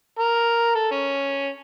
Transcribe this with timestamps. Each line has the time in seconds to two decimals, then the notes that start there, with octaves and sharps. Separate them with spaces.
0.19 A#4
0.75 A4
0.91 C#4